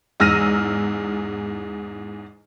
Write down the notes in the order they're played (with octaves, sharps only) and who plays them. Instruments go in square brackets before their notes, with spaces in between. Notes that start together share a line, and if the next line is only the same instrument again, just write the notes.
[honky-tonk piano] E2 G#2 E6 F6 A#6 D#7